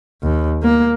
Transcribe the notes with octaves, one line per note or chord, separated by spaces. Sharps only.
D#2
A#3